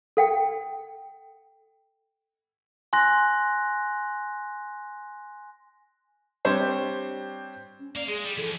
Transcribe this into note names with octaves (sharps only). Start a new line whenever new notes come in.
A4 F#5 G5
G#5 C6 F#6 A#6
G3 C4 D4 G4 C5 C#5
C#4
A#3 D5 F5
G#3 G#4
G3
E3 F3 A4